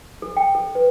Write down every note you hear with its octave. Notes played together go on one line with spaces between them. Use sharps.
A4
G5
A4
B4